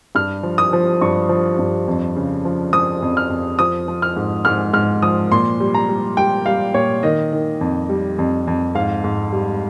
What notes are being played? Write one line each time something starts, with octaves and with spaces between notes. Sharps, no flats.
G2 F6
F3
D#6
F3
G2 C#6
F3
G2
F2
C#3
F3
F3 D#6
F2
F6
F2
F3 D#6
F3
F6
G#2
G#2 F6
G#2 F6
F3 D#6
A#2 C6
G3
A#5
G3
G3 G5
G3 F5
A#2 C#5
D#3 D#5
D#3
F2
G3
F2
F2
G#2 F5
G#2
G3